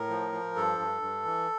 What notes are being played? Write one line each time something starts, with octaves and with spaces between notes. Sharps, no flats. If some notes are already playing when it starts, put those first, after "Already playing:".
Already playing: A2 A#4
F3
F3
G2 A4
G2
G2
E3